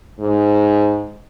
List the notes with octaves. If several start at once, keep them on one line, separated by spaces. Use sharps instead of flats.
G#2